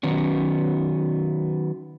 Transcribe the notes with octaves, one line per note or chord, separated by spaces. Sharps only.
D#3 F#3 B3 C#4